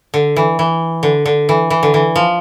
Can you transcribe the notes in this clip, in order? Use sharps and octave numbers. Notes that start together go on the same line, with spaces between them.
D3
E3
E3
D3
D3
E3
E3
D3
E3
F3